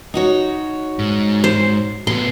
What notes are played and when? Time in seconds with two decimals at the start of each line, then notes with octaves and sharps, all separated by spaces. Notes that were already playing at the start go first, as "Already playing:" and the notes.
0.14 D#4 F#4 C#5
0.99 G#2
1.44 C5
2.07 A2 B3 C6